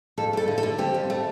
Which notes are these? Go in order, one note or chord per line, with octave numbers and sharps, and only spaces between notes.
F2 A4
A3 A4
D3
A4
D3
C4 G4
F2
A3